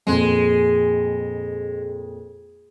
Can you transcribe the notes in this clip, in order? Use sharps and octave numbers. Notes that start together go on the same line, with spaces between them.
F2 A#2 G#3